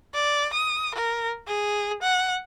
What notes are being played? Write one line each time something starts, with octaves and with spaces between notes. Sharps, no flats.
D5
D#6
A#4
G#4
F#5